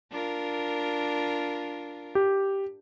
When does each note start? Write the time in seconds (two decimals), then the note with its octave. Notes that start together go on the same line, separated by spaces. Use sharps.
0.11 D4 F4 A#4
2.15 G4